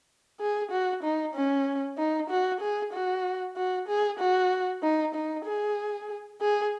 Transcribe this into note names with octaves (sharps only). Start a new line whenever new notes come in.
G#4
F#4
D#4
C#4
D#4
F#4
G#4
F#4
F#4
G#4
F#4
D#4
D#4
G#4
G#4